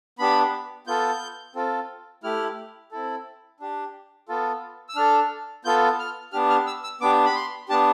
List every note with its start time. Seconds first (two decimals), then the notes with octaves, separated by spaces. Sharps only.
0.19 B3 D4 G4 B5
0.87 B3 F4 A4 G6
1.55 C4 F4 A4
2.23 A3 E4 G4 F6
2.92 C4 E4 A4
3.60 D4 G4
4.29 B3 F4 A4
4.89 E6
4.96 D4 A4 F6
5.65 B3 F4 A4 G6
5.99 F6
6.32 B3 D4 G4 F6
6.50 F6
6.67 E6
6.84 E6
7.01 B3 D4 G4 D6
7.25 B5
7.36 C6
7.69 B3 D4 G4 A5